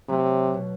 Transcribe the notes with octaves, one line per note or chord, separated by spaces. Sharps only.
C3 F#3 A3
B2